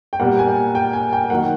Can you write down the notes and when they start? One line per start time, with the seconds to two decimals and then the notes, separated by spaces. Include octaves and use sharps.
0.13 G5
0.20 A#2 G3 B3 F#5
0.39 G#5
0.47 G5
0.75 G5
0.93 G#5
1.13 G5
1.30 D#3 F#3 A#3 F#5